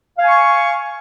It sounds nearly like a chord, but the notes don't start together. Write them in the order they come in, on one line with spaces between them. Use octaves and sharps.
F5 G#5 C#6